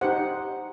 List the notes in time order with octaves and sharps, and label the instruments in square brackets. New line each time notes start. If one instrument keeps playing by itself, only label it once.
[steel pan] D#4 G4 C5 F#5